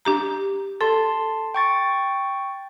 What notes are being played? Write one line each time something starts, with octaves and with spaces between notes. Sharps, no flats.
D4 G4 A#5
A4 A5 C6
G5 C#6 A6